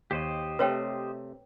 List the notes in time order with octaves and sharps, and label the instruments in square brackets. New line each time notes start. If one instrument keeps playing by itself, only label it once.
[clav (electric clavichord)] D#2 [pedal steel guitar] G4 C5 D#5
[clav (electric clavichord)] C3 A3 [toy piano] B4 C#5 G5